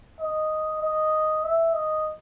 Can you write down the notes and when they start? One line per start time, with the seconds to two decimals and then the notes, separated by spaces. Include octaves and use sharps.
0.20 D#5
0.82 D#5
1.44 E5
1.74 D#5